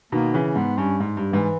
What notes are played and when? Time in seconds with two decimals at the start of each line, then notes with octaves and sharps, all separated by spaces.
0.12 B2 D#3 A#3
0.34 C#3 E3
0.56 G#2 B3
0.78 G2 C#4
1.00 G#2
1.17 G2
1.32 G#2 E3